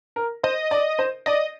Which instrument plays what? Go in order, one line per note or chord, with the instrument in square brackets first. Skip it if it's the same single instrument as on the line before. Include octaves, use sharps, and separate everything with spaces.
[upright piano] A#4
[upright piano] C5 [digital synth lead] D#5
[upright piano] D5
C5
[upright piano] D5 [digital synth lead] D#5